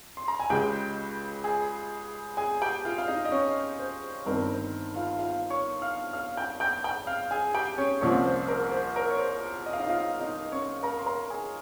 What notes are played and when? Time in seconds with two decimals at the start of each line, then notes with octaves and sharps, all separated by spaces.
0.17 C6
0.28 A#5
0.40 G#5
0.50 C#2 C#3 G#3 G4 G5
1.44 G#4 G#5
2.37 G#4 G#5
2.61 G4 G5
2.85 F4 F5
2.98 F5
3.08 D#4 D#5
3.25 D#5
3.31 C#4 C#5
3.79 C5
4.26 G1 G2 D#3 G3 C4 A#4
4.49 C5
4.96 F4 F5
5.19 F4 F5
5.50 C#5 C#6
5.82 F5 F6
6.13 F5 F6
6.37 G5 G6
6.60 G5 G6
6.84 G5 G6
7.07 F5 F6
7.31 G#4 G#5
7.55 G4 G5
7.78 C#4 C#5
8.01 C2 A#2 F3 C4 C#4 C#5
8.25 C5
8.48 A#4
8.72 C5
8.96 A#4
9.10 C#5
9.19 C5
9.66 D#5
9.73 F5
9.80 D#4 D#5
9.89 F4 F5
10.20 D#4 D#5
10.52 C#4 C#5
10.83 A#4 A#5
10.99 C6
11.06 A#4 A#5
11.30 G#4 G#5